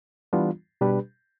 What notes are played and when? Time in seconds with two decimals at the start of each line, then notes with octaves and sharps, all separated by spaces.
0.33 E3 G3 B3 D4 F4
0.81 B2 G3 D4 G4 B4